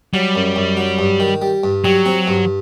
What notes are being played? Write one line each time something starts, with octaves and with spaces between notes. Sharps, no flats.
F#3 G3
F#2
F#2
F#3
G2
D#3
G3
G2
F#3 G3
C4
G2